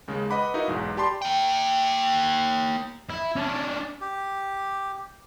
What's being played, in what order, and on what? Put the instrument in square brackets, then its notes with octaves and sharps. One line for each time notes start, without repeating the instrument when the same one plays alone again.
[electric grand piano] D#2 C#3 G#3
B4 D#5 F#5 B5 D6
D#4 E4 F#4 A#4 D#5 F5
B1 E2 G#2
G4 D5 A5 B5 C6
[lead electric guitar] A#3 G5
[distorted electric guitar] E4
C#4 D4
[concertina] G4